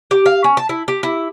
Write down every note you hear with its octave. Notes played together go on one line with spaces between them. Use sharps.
G4
F5
C#4
A5
E4
G4
E4